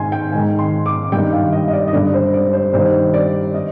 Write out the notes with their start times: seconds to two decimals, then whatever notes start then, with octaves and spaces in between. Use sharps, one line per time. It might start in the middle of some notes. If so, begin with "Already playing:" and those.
Already playing: G#2 D#3 G#5 C6
0.12 G5
0.32 G#2 D#3 G#5
0.59 C6
0.86 D6
1.12 G2 D#3 G5
1.33 F5
1.52 D#5
1.68 D#5
1.73 D5
1.88 D#5
1.93 G2 D3 D5
2.14 C5
2.34 D5
2.53 C5
2.73 G2 D#3 C5
3.14 D5
3.54 D#5